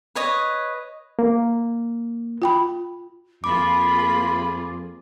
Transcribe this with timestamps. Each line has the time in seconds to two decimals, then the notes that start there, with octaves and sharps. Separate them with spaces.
0.15 B4 C#5 D#5
1.19 A#3
2.42 F4 G5 B5
3.44 F2 A#3 F4 G#4 B5 D6